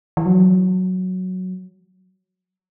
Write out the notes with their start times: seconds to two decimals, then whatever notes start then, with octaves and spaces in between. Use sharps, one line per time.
0.17 E3
0.26 F#3